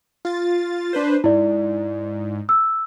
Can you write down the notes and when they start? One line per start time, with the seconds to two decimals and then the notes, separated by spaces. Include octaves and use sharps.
0.25 F4 A6
0.93 D4 B4 C5
1.24 G#2 E4 D5
2.49 E6